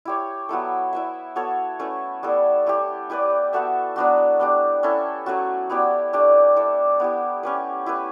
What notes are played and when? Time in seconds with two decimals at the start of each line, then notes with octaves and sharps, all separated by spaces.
0.05 E4 G4 C#5
0.49 F#3 B3 E4 A4
0.93 E4 B4 E5
1.36 B3 F#4 A4 C#5
1.79 A3 C#4 E4 B4
2.23 G3 B3 E4 A4
2.66 A3 E4 G4
3.10 E4 G4 B4 D5
3.53 B3 F#4 A4 E5
3.96 F#3 B3 D4 F#4
4.40 B3 D4 G4
4.83 C#4 E4 A4
5.26 F#3 A3 C#4 F#4
5.70 B3 E4 G4 D5
6.13 A3 D4 G4 D5
6.56 E4 A4 D5
7.00 B3 E4 G4
7.43 C#4 G4 B4
7.86 E4 G4 B4